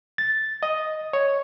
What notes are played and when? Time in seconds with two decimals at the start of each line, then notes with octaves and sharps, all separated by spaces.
0.18 A6
0.63 D#5
1.13 C#5